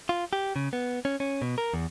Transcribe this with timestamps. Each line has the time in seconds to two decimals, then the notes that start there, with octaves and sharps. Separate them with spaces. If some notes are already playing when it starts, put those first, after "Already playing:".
0.09 F4
0.33 G4
0.56 C#3
0.73 B3
1.05 C#4
1.20 C#4
1.42 B2
1.58 A#4
1.74 E2